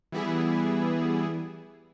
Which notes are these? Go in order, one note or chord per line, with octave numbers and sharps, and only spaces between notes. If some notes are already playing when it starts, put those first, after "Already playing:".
E3 G3 B3 E4 G#4